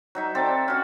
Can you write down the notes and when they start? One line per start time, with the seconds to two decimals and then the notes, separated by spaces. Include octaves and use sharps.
0.15 F#3 D#4 E5
0.35 C4 A4 D5
0.68 C#4 F#4